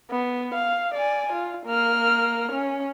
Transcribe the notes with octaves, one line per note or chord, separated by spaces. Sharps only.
B3
F5
D5 G#5
F4
A#3 F6
C#4